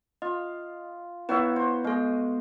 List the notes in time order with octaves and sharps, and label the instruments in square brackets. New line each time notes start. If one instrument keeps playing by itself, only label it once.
[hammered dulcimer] F4 [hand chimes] D#5
[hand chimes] B3 E4 B4 [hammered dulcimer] F#4 C#5 E5
[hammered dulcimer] C5
[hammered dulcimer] G#3 [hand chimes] B3 A4